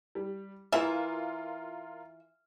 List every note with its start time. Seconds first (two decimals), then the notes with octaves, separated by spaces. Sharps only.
0.15 G3
0.72 E3 F4 A#4 E5